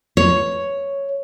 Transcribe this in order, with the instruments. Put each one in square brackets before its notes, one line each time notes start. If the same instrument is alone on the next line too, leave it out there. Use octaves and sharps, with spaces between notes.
[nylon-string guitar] C#5